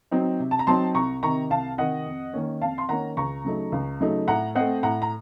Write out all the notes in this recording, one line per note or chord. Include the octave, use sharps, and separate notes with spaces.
F#3 C4 D#4
C3
A5
A#5
F#3 C4 D#4 A5 C6
C2 A#5 C#6
C3 D#3 A#5 C#6
C2 F5 A5
C3 D#3 D#5 F#5
F2
D#3 A#3 C#4
F2 F5 A5
C6
D#3 A#3 C#4 F#5 A#5
C#2 A#5 C#6
C#3 F#3 A3 D#4
C#2
C#3 F#3 A3 D#4
A2 F#5 A#5
A3 C4 D#5 F#5
A2 F#5 A#5
A#5